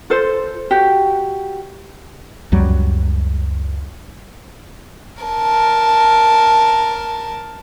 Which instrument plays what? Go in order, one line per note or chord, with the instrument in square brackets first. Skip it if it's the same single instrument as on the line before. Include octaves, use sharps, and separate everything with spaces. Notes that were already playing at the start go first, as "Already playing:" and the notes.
[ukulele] F4 A4 C5
F#4 G4
[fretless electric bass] C#2 F#2 F#3 G3
[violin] A#4 A5